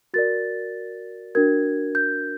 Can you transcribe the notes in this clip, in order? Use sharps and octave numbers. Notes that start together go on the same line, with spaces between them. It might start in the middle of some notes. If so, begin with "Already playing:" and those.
F#4 A#4 D5 A6
D4 F#4 A#4 G#6
G6